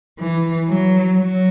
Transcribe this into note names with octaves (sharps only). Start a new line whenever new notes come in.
E3
F#3
F#3